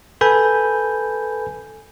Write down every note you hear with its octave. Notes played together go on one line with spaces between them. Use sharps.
A4 B4 G#5 B5 G6